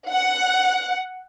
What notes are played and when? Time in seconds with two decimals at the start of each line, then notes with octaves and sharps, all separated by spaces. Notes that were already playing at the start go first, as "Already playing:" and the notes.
0.11 F#5